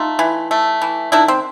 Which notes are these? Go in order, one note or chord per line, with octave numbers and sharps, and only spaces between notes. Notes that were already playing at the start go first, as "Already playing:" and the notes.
Already playing: A3 D#4 F4
E3
A3
E3
D#3 D4 E4
C4